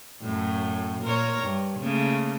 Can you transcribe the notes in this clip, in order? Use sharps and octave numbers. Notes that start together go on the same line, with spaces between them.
F#2 A2
A#2 A#4 C#5
G2
C#3 A3 A#3